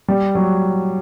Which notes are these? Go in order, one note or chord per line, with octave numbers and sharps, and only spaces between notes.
G3
F#3